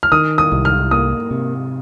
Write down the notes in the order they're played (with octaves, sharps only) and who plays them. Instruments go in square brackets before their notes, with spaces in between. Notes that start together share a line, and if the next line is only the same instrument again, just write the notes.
[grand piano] F6
[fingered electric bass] D#3 [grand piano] D#6
[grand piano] D#6
[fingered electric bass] C2
[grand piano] F6
[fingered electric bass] A#3 [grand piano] D#6
[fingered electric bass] C3